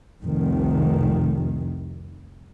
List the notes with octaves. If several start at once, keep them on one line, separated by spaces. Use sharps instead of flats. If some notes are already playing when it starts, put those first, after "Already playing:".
F1 C2 D#3